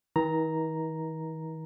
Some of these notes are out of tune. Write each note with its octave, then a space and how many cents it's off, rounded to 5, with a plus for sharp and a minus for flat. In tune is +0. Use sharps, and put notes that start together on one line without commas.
D#3 +45 A#5 +0